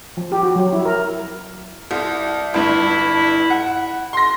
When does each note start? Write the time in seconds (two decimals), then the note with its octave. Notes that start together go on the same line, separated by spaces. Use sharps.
0.17 F3
0.32 G4
0.43 F#4
0.56 F#3
0.73 E4
0.85 A#4
1.91 C2
2.54 G1 G2 E4
3.50 F#5
4.13 C6 A#6